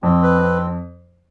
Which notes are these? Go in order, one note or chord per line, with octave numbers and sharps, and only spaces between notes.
F2 C4
B4
C4